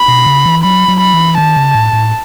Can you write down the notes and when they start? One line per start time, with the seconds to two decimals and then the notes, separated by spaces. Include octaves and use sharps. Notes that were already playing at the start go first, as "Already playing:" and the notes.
Already playing: B5
0.08 B2
0.26 C#3
0.46 E3
0.63 F#3 B5
0.88 F#3
1.00 B5
1.13 E3
1.38 D#3 A5
1.56 C#3
1.75 A2
1.93 A2